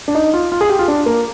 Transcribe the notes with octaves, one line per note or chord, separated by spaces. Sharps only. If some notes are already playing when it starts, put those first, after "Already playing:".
D4
D#4
F4
F4
G#4
G4
F4
D4
A#3